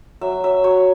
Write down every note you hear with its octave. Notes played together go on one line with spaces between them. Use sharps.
F#3 E5
F#3 E5
F#3 C#5